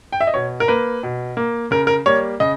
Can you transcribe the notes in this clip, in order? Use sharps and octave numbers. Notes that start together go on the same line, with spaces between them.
G5
E5
D#5
B2 C#5
A#4
A#3 B4
B2
A#3
C#3 A#4
A#4
G3 A#3 C#5
C#3 D#5